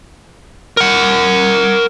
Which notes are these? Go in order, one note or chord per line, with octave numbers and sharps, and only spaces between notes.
A#4 F#5